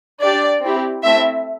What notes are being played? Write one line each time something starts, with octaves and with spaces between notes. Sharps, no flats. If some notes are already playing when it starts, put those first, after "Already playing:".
D4 G4 D5
C4 E4 G4
A3 C4 E4 E5